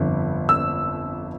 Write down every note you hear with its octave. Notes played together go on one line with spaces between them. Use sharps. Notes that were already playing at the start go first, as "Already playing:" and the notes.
Already playing: G1 F2 D3
E6